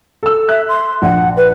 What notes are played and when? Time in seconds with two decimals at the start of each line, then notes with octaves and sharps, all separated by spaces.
0.23 A4 E6
0.49 E5 F#6
0.69 C6
1.02 A#1 F#5
1.37 B4